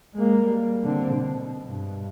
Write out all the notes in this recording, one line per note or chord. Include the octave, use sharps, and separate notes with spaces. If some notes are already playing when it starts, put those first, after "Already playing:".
G#3 A#3
G3
D3 C4
B2
G2 B2